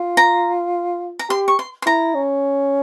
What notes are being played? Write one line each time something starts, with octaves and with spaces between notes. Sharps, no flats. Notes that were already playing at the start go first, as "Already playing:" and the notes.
Already playing: F4
A#5
A#5
G4 C6
C#6
C6
C6
E4 A#5
C#4